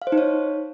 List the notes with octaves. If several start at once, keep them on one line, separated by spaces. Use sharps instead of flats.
F5
C5
D#4
C#5